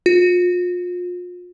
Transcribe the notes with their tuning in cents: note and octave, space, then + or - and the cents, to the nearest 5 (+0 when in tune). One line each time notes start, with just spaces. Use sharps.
F4 +35